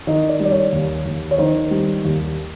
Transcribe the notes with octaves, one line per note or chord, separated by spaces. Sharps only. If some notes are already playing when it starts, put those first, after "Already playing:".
D#3 D#5
D5
G3
D5
C#5
D#2
D#2
C#5
D#3 C5
G3
D#2